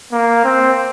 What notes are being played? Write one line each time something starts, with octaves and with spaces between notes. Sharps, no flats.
A#3
C4